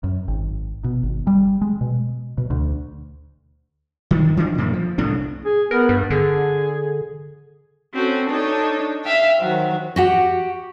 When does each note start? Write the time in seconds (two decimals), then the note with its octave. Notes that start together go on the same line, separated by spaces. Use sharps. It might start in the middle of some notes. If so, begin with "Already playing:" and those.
0.04 F#2
0.28 G#1
0.84 B2
1.03 G#1
1.27 G3
1.62 G#3
1.81 B2
2.38 B2
2.50 D2
4.11 G2 D#3
4.37 E3 D4
4.58 F#2 A#2 D3 A#3
4.73 F3
4.98 C2 A2 A3 D4
5.45 G#4
5.71 B3 A#4
5.89 G2
6.10 D3 G#4
7.94 C4 C#4 F#4 A4
8.28 D4 D#4 A4 C#5
9.04 E5 F5 G5
9.38 D#3 F#3 F#4 C5
9.96 F#4 G4 F#5